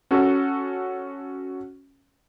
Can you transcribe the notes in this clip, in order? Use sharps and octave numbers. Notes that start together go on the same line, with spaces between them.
C#4 F#4 A4